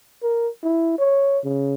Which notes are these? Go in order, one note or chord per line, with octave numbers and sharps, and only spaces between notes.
A#4
E4
C#5
C#3